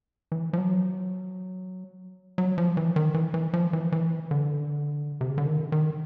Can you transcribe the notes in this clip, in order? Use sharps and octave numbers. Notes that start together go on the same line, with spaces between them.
E3
F3
F#3
F#3
F3
E3
D#3
E3
E3
F3
E3
E3
D3
C3
C#3
D3
D#3
D#3